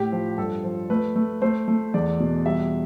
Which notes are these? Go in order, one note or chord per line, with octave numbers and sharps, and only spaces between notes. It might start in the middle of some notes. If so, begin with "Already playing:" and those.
Already playing: A2 G4
F3
G2 A4
F3
A3 B4
A3
A3 C5
A3
E2 D5
B2
G3 E5